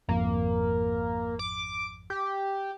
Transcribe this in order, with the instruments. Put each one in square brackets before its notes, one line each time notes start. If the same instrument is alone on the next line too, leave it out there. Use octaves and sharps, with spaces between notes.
[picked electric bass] G#1 F2 [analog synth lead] A#3
[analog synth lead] D6
G4